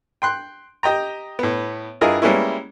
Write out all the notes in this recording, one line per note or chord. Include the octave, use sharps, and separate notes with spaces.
G5 C6 F#6
G4 D#5 G5 A#5
A2 B3
G2 E4 F4 G#4 A#4 D#5
G3 G#3 A#3 B3 C#4 E4